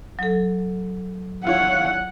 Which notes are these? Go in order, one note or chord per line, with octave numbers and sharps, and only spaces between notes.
F#3 A4
E4 F4 C#5 F#5